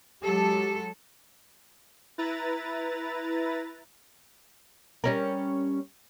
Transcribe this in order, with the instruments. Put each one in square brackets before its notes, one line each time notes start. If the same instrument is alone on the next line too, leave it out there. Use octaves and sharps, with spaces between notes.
[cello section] F#3 G#3 A4 [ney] G4
[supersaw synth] E4 B4 A#5 A6
[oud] G3 C#4 A#4